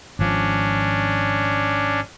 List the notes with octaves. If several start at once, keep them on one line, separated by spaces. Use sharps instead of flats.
G#1 F3 C#4 D4